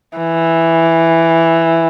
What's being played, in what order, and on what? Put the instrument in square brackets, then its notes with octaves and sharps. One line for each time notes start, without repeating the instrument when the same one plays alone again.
[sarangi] E3